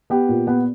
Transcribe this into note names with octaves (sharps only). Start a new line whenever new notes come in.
B3 G4
A#2
B3